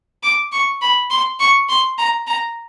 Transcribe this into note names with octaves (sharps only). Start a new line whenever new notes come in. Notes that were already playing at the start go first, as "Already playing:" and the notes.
D6
C#6
B5
C6
C#6
C6
A#5
A#5